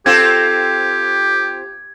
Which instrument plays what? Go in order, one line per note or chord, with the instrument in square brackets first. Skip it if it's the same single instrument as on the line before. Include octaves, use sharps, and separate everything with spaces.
[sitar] C4 F4 A4 [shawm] G4 [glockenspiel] G#6